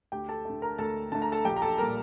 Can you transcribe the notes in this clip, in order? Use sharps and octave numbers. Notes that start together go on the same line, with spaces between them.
D2 G4 G5
A4 A5
D3 A3
A#4 A#5
D2 A4 A5
D3 A3 A5
A#5
A4 A5
A#1 G4 G5
A#5
A4 A5
A#2 G3 A#4 A#5